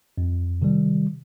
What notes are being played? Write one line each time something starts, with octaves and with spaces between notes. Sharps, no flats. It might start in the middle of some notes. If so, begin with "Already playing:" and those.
F2
C3 D#3 G3